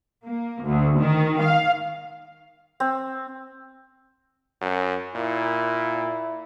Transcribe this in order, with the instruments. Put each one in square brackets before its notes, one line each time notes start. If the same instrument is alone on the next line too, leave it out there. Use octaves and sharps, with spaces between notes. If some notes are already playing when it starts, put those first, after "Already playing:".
[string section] A#3
D2
D#3
F5
[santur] C4
[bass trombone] F#2
[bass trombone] A#2 [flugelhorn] E4